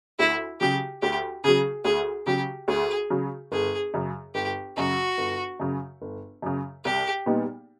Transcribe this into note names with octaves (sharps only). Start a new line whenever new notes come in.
D2 E4
C#3 F#3 G4
D2 G4
C#3 F#3 G#4
D2 G#4
C#3 F#3 G4
D2 G#4
C#3 F#3
G1 G#4
F#2 C#3
G1 G4
F#2 C#3 F#4
G1
F#2 C#3
G1
F#2 C#3
C2 G4
A#2 G3 B3 D#4